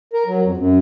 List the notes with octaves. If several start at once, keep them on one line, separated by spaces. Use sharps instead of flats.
A#4
F#3
F2
F#2